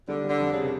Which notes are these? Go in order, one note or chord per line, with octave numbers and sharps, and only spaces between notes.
D3 G3
D3 G3
F2
C#3
C3
B2